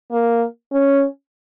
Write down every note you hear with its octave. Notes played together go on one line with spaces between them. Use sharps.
A#3
C#4